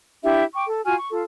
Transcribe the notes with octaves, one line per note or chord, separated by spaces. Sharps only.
D4 E4 G4 E5
G5 C#6 D6
A4
F4 F#4 G#5 F6
C#6
F4 A4